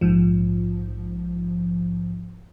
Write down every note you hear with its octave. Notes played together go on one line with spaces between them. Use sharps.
A#1 G#2 F3